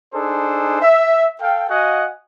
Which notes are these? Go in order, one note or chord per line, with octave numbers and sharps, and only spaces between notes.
D4 D#4 G#4 A4 C5
E5
A4 F5 G5
F#4 D#5 F5 F#5 G#5